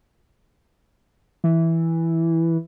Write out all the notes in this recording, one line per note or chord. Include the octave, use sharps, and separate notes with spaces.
E3